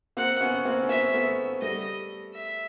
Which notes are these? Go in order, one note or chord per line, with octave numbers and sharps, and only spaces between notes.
A#3 C4 F#5
B3 C#4
A#3 C4
C#4
A#3 C4 E5
A3 B3
G3 A3 D#5
E5